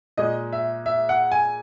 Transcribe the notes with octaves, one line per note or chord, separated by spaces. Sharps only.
A#2 G#3 D#5
E5
E5
F#5
G#5